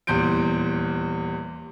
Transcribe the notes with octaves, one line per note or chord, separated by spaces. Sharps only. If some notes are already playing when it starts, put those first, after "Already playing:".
D#1 E2 C6 G6 D7